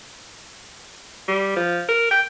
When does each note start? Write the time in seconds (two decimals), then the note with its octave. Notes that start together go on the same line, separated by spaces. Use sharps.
1.28 G3
1.56 F3
1.89 A#4
2.11 G5